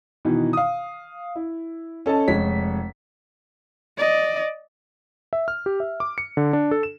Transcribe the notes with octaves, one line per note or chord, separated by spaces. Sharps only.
B2 D#3 E3
F5 D#6
E4
C#4 A4 D#5 A5
F1 G#3 C#5 B6
D5 D#5
E5
F6
G4
E5
D6
C#7
D3
D4
A4
E7